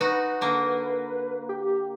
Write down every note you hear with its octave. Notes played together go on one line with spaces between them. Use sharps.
D#4 F#4 B4
D3 A#3
G4